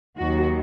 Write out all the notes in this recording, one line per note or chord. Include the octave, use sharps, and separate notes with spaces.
D#2 D#3 F#3 F#4